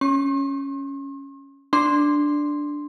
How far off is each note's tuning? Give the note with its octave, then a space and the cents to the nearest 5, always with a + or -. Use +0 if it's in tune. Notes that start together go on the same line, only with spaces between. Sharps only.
C#4 +0 C6 +45
D4 +0 C6 +0